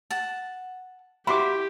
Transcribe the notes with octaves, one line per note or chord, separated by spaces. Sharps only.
F#5 A5
E4 F#4 G4 A#4 B5 C6 D6